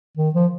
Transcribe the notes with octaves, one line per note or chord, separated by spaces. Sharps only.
D#3
F3